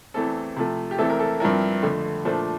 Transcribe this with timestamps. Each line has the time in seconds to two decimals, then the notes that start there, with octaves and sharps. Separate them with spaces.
0.14 E2 E3 A3 C4 A4
0.57 C3 F3 A3
0.91 G4
0.98 E2 E3 A3 C4 E4 A4
1.10 A#4
1.19 A4
1.40 G2 F3 C4 E4 A#4
1.83 F2 D3 A3
2.25 A#2 F3 A3 D4 C5